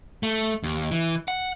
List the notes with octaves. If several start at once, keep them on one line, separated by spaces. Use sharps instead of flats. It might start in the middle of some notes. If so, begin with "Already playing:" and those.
A3
D#2
E3
F#5